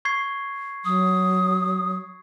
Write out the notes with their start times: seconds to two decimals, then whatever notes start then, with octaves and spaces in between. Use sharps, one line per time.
0.05 C#6 G#6 C7
0.85 F#3 D#6